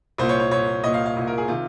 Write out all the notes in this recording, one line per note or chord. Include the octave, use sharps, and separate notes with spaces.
C2 A#2 C5
C#5
C#5
C2 A#2 C#5
C2 A#2 D#5
F5
F5
C2 A#2
A#4
G#4
C3 D#3 F4